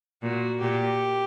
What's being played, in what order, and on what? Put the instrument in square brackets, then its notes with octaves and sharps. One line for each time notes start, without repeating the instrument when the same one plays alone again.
[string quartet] A#2 [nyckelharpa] F#4
[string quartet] A#2 [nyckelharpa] G4